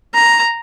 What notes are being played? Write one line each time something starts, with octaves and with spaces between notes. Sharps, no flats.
A#5